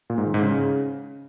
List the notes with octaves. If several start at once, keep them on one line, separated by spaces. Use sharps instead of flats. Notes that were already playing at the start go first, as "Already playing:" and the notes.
A#2
G#2
D#3
G#2
C#3